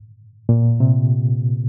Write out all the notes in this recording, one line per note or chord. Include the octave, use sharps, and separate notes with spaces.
A#2
C3